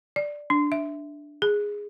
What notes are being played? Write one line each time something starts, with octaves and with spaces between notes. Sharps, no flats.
D5
D4
E5
G#4